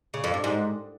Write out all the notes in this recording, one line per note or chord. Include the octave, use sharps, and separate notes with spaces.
C#3
F2
G2
G#2